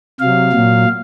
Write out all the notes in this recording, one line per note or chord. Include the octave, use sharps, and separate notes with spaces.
C3 F#3 F5
A#2 F#3